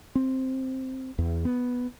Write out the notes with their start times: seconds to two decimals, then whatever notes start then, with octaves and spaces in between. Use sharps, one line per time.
0.15 C4
1.18 E2
1.45 B3